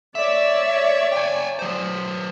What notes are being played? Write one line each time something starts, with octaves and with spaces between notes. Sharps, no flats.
C#5 D5 E5
G5 G#5
F#3 C5